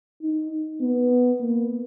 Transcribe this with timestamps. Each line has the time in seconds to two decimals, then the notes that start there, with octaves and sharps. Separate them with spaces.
0.23 D#4
0.81 B3
1.41 A#3